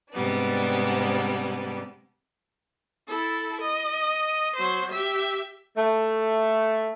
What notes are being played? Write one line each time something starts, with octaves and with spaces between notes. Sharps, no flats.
G#2 C3 G3 B3 D4
E4 A4
D#5
F#3 C5
G4 E5
A3